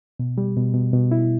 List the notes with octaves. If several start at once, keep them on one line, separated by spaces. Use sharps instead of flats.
B2
G3
B2
B2
B2
E4